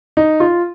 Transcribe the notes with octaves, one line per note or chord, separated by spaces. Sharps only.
D#4
F4